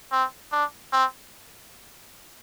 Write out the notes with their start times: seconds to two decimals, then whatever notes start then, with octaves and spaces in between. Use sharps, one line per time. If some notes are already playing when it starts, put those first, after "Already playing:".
0.12 C4
0.52 D4
0.93 C4